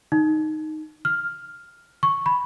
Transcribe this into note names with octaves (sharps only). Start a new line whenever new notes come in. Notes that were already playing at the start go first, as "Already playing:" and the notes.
D#4
F6
C#6
B5